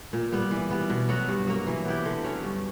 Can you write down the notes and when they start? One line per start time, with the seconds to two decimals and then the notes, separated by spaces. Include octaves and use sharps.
0.13 A#2
0.32 G3 B3
0.51 E3
0.70 G3 B3
0.90 B2
1.09 F#3 B3 F#4
1.28 G2
1.47 F#3 A#3
1.67 E3
1.85 B3 E4 G4
2.05 D3
2.24 F#3 C#4
2.43 G2